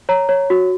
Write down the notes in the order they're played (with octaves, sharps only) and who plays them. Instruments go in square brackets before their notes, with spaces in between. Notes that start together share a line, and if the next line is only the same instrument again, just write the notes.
[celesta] C#5 A#5
C#5
F#4